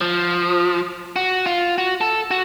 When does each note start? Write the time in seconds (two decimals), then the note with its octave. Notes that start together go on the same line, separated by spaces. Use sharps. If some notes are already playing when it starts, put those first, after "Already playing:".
0.01 F3
1.16 F#4
1.46 F4
1.78 F#4
2.01 A4
2.31 F#4